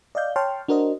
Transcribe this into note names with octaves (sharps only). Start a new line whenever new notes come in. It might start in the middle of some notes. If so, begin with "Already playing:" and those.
D5 D#5 F5 G6
C#5 G5 A5 C6 C#6 F6
D4 F#4 A#4 C5 D#5